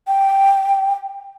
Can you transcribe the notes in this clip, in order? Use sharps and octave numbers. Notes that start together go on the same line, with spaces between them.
G5